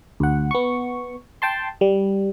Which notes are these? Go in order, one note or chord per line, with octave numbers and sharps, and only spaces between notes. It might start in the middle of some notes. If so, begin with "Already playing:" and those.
D2 F#5
B3 C#6
G5 A5 C6
G3